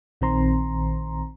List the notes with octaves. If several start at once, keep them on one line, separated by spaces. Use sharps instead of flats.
A#1 D#3 C4 A#5 C6